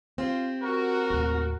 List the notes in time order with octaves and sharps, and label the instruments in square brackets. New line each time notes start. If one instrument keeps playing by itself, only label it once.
[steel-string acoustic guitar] C4 G4 [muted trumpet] F4
[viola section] F#4 [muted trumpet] A#4
[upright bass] D#2 A2